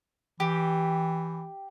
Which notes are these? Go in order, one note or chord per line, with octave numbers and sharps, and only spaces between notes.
E3 G4